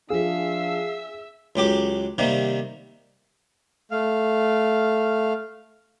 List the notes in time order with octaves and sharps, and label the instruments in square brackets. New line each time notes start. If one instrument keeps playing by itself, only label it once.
[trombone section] F3 D4 [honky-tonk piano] G#4 [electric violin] E5 E6 [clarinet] F5
[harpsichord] C#2 F#3 G4 D6
C3 D#3 G3 A#3
[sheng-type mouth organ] A3 F5